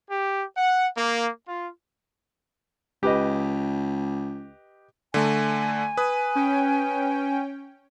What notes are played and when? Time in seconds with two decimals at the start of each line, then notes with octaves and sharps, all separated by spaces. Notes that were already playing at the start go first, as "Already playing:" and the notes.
0.11 G4
0.57 F#5
0.97 A#3
1.48 F4
3.03 C#2 G4 B4 D#5
5.14 D3 A3 G#5
5.97 B4 D#6
6.35 C#4 G5